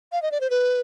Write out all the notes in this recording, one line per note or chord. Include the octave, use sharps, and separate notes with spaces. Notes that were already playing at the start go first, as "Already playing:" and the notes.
F5
D#5
D5
C5
B4